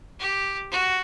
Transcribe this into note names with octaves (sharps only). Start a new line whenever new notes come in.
G4
F#4